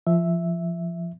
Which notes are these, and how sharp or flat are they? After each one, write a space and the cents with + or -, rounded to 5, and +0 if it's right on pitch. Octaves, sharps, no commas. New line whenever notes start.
F3 -20 E5 +0